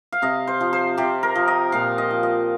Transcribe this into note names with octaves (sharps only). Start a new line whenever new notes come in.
F5
C3 D#5
C5
F3
C5
C3 G4
A#4
F3
D#5
A#2 F5
D#5
F3
D#5